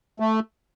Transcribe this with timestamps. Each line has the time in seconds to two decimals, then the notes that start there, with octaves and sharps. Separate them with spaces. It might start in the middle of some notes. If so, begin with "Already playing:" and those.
0.20 A3